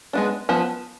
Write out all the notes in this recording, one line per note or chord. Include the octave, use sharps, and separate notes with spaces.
G#3 B3 D4
F3 B3 A5